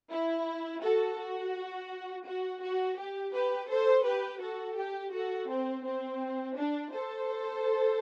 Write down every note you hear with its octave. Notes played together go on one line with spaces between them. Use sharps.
E4
F#4 A4
F#4
F#4
F#4
G4
G4 B4
A4 C5
G4 B4
F#4 A4
G4
F#4 A4
C4
C4
D4
A4 C5